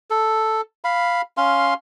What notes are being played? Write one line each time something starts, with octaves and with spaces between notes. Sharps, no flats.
A4
F5 B5
C#4 F5 C6